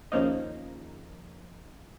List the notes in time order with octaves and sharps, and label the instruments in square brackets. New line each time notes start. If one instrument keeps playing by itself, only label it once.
[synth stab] D#2 C#3 F3 A#3 D#4